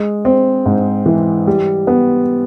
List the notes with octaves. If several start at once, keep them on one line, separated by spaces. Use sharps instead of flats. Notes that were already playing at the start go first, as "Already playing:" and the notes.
Already playing: G#3
C4
G#2
E3
G3
B3